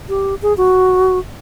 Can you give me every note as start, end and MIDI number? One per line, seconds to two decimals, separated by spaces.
0.09 0.35 67
0.42 0.56 68
0.57 1.19 66